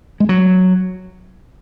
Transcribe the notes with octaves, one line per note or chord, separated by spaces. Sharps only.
G#3
F#3